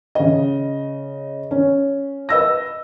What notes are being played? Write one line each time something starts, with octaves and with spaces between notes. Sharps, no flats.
C#3 D#5
C#4
B4 D#5 E6 A#6